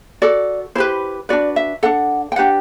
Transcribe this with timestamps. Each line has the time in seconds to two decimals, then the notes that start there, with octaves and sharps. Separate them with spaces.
0.22 F#4 A4 D5
0.75 E4 G4 B4 C5
1.29 D4 F#4 B4 D5
1.56 E5
1.83 D4 A4 F#5
2.32 G5
2.36 D4 G4 B4 F#5